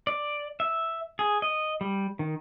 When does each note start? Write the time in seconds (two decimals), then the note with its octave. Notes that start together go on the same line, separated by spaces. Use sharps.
0.07 D5
0.60 E5
1.19 G#4
1.42 D#5
1.81 G3
2.19 D#3